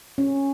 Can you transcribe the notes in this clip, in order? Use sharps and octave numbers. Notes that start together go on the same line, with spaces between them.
C#4